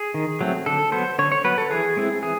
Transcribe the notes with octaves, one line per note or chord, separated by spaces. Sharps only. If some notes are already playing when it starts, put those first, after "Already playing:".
Already playing: G#4
D#3
F#3 A3 C4
D3 A4
F#3 B3 C5
D3 C#5
C#5
F#3 B3 B4
A4
E3 G#4
G#3 C4 E4
E3 G#4